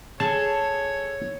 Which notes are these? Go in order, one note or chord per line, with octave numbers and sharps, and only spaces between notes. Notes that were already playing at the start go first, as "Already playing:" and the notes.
G#4 A4 C#5 A5